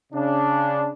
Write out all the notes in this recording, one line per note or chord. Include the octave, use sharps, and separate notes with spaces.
C#3 D4